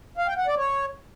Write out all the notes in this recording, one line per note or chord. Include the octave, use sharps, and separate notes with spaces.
F5
G5
F#5
D5
C#5